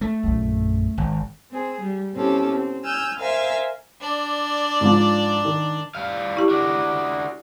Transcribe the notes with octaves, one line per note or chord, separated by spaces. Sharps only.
A3
A#1 F#2
G#1
C4 G#4
G3
B2 C4 C#4 E4 G4 A4
C4
G#5 E6 F6 G6
A#4 C5 E5 F5 G#5
D4 D5
G#2 F3
D#3
G3 F5
E4 G4
D4 F#4